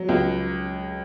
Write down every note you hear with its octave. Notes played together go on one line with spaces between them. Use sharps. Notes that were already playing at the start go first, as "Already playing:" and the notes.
Already playing: F#3
C#2